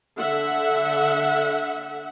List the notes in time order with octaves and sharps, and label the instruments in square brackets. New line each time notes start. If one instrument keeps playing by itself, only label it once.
[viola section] D3 E5 F#5